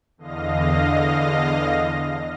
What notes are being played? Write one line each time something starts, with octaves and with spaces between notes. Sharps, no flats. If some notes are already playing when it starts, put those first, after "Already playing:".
E2 D3 D#5 F5 A#6